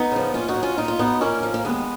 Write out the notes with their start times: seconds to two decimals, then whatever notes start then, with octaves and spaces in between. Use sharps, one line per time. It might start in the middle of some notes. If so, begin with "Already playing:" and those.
Already playing: B3 D#4
0.12 C#3 F3
0.34 A#2 C#4 F4
0.48 D#4 F#4
0.56 F#3
0.63 C#4 F4
0.77 A#2 D#4
0.88 F4
0.99 F#3 B3 D#4
1.21 A#2 A#3 C#4
1.43 F3
1.54 A#3
1.65 D#2 G#3 B3